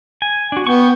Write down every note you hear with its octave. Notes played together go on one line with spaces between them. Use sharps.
G#5
D4 F#4
B3 G5 C#6